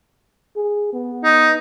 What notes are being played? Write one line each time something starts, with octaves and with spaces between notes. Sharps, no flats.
G#4
B3
D#4